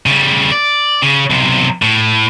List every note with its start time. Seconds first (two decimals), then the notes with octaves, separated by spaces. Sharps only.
0.06 C#3 G3
0.52 D5
1.02 C#3
1.30 B1 C3
1.82 A2